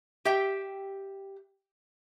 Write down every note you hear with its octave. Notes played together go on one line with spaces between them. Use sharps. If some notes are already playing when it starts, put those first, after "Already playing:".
G4 E5 G5